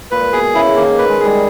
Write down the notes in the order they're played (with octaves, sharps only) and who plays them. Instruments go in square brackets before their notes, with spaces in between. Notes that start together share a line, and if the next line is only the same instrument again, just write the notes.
[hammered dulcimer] A#2 [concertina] B4
[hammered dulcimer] B2 [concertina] G#4
[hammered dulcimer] C#3 [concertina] E4
[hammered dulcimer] D#3 [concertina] A#3
[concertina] B4
[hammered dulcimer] G#3
[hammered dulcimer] G3 [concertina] G#4